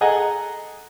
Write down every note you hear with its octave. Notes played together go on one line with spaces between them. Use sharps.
G#4 A4 D#5 F#5 G#5 A#5